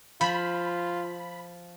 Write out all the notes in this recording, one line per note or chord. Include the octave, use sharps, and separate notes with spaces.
F3 F4 B5